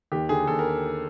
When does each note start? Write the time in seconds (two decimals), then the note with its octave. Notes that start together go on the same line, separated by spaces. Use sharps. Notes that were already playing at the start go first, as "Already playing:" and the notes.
0.12 D#2 G4
0.29 D3 G#4
0.47 D#2 A4
0.59 A#4